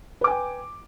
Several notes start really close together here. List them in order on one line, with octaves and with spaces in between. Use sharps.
B4 D6 G#5 G5